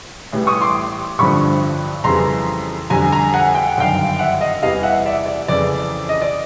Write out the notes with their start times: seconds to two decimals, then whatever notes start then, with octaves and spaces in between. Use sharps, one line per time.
0.33 A1 A2 E3 G3
0.47 C#6 D#6
0.61 C6 D6
1.18 A1 G2 D3 F3 B5 C#6
2.04 F2 C#3 E3 G3 A#5 C6
2.90 F2 D3 G3 G#5 A#5
3.12 G#5 A#5
3.33 F#5 G#5
3.55 G5
3.67 F#5
3.77 G1 F#2 D#3 F5 G5
4.19 E5 F#5
4.41 D#5 F5
4.62 E2 C3 E3 G3 D#5 F5
4.83 E5 F#5
5.06 D5 E5
5.26 D5
5.48 F2 C#3 E3 D5
6.09 D#5
6.22 D5